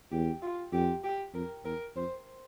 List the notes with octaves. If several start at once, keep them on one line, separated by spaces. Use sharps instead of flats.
E2 G4
F4
F2 G4
G4
F2 A#4
E2 A#4
F2 C5